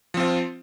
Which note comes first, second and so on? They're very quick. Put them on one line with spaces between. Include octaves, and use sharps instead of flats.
F3 C4 F4